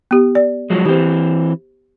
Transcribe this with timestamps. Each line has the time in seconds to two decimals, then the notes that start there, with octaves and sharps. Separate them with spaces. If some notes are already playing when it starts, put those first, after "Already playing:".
0.11 B3 G4
0.35 D5
0.70 F3 F#3 G#3
0.85 E3 C4 G4 C5